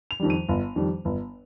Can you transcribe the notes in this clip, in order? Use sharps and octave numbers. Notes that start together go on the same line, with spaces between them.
F7
F2 D#3 G3
D#7
G1
F2 D#3 G3
G1